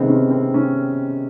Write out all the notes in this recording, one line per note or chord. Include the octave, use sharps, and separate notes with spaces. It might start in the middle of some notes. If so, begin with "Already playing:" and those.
Already playing: C3 D#3 G#3 B3 C4
C#4
C4
C#4